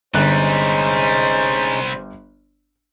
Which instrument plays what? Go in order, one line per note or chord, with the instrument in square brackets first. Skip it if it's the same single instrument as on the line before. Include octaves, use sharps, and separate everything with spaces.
[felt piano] G1 F#6 [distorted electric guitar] C3 G3 [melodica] G#3 C#4 D#4 [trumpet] C5